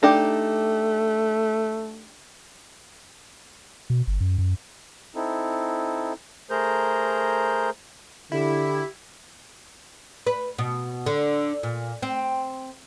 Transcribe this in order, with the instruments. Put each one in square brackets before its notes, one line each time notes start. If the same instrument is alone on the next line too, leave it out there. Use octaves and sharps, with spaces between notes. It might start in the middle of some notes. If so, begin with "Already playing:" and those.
[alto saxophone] A3 [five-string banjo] D4 D#4 G4
[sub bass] B2
G1
F#2
F#2
[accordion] C4 D#4 E4 A4
A3 G#4 A#4 C5 A#5 G6
[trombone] D3 [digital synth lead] E4 [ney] G4
[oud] B4
B2
D3
A#2
C4